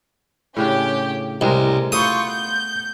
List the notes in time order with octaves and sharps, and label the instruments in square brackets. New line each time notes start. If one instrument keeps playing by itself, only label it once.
[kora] A2 C#3 D4 [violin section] C#4 G4 G5
[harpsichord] C2 [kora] A2 G#3 G#4 [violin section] A#4
[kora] A3 B3 [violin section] F4 C#6 G6 [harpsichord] D#6
[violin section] G6